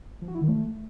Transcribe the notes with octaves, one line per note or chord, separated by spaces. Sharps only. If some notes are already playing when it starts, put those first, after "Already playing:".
F3
F#4
E4
D#3
A3